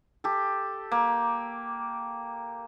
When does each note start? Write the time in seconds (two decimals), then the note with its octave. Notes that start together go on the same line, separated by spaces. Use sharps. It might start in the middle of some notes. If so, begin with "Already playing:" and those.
0.24 G4 A4
0.91 A#3